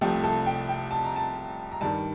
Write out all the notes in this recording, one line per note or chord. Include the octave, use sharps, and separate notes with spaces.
C2 C3 F3 A3 G4
A4
G5
G5
A5
A#5
A5
A#5
G2 D#3 G3 A5